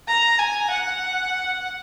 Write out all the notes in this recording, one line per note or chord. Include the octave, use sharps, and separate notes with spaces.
A#5
G#5
F#5